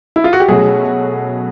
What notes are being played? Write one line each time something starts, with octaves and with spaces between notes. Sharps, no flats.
E4
F4
F#4
G4
B2 F#3 A3 C#4 F#4 G#4